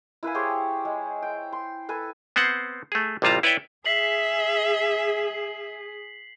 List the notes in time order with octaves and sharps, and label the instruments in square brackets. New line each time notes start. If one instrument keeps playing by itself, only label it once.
[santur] E4 B4 F5 G#5
G4 G#4 C5 C#5
G#3
G5
C6
A4 B4 G#5
[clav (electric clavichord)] B3 C4 C5 F#5
A3 G#4
A1 C3 G3 F4 A5 A#5
E4 B4 C#5 D5 E5 G5
[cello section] G#4 [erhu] E5 [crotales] B6 C7 F#7